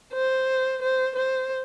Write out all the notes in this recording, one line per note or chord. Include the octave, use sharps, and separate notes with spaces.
C5
C5
C5